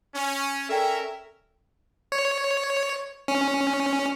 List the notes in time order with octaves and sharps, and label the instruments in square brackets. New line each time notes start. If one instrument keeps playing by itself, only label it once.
[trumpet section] C#4
[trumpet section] C#4 A#4 E5 [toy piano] A4 D5 G5
[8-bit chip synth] C#5
C#4